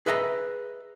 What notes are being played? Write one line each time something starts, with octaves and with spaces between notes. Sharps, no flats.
G#4 B4 D#5 E5 A5 A#5